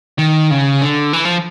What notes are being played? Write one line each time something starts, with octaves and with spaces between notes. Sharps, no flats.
D#3
C#3
D3
E3
F3